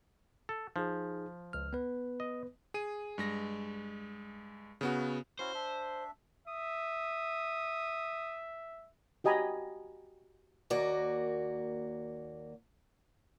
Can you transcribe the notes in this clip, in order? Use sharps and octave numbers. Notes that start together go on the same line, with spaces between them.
A4
F3 D#4 G#4
C#2 F6
B3 B4
D#5
G#4 D#7
G2 G#3 A#6
C#3 B3 F#4
C#4 E4 F#4 C5
D4 E5
E5 D#6
F#4 G4 D#5 G#5 A#5 B5
D#2 A#3 F#4 D5